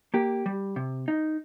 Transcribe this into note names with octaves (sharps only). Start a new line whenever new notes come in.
A#3 G4
G3
C3
D#4